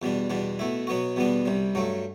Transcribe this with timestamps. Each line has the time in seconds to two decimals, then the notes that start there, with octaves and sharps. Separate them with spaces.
0.02 E2 B2 G3 D4
0.30 E2 B2 G3 D4
0.59 B2 A3 E4
0.87 B2 F#3 B3 F#4
1.16 E2 B2 G3 B3 D4
1.45 C2 C3 G3
1.75 G2 F#3 A3